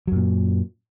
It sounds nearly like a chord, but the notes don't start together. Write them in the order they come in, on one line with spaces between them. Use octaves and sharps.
F#3 F#2 A#2